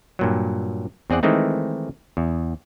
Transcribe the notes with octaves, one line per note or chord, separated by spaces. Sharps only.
G2 A#2 F#3
E2 C4 G#4 D5 F#5
D#3 E3 G#3 A3 C4 D#4
E2